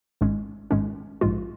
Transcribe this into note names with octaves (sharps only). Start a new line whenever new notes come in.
G#1 G#2 G#3 C#4
G#1 G#2 G#3 C#4
A#1 G#2 G#3 F4